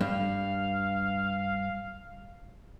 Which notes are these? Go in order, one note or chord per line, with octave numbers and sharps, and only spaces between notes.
G2 F5